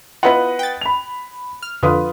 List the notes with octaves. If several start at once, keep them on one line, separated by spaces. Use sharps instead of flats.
B3 E4 F4 B4 D#5 F#5
G5 A6
B5 F7
F6
F2 D3 F4 B4 D#6